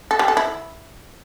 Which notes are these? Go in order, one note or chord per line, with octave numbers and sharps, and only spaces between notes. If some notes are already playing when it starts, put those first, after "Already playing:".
A4
G3
A4
E4